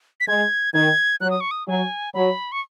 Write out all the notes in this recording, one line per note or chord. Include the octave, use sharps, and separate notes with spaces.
B6
G#3 G#6
D#3 G#6
F#3 F#6
D#6
C#6
D#6
F#3 G#5
F#3 B5
C#6